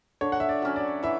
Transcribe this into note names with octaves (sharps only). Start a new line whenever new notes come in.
D3 C#5
F#5
E5
D5
F#3 C#4 F#4
D5
E3 E5